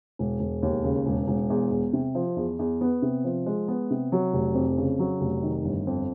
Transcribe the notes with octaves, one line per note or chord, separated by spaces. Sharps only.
E1
E1
D#2
C#3
E1
E1
E2
E2
C3
F3
E2
E2
B3
C3
F3
G#3
B3
C3
F#3
F1
F2
C#3
F#3
F1
D#3
G1
F2